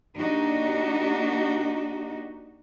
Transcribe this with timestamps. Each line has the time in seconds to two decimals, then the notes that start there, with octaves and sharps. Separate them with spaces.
0.16 A#3 D4 D#4 F#4 G4